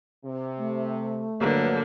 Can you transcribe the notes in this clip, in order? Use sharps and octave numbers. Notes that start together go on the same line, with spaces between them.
C3
A3
G2 D3 F#3 A#3 A#4 B4